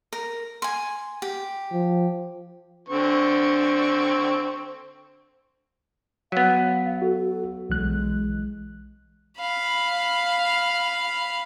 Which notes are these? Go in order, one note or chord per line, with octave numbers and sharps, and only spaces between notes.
A#4
G#5 C6
G4
F3
D3 C4 C#6
F#3 B3 F5 B6
F#4 A4
B1 E3 G#3 F#6
F5 B5